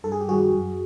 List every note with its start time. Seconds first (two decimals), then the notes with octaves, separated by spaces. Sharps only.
0.04 G2 A4
0.12 G#4
0.21 G4
0.28 D#3 G3 F#4 G#4
0.52 F#2